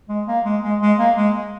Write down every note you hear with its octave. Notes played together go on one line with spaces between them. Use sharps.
G#3
A#3
G#3
G#3
G#3
A#3
G#3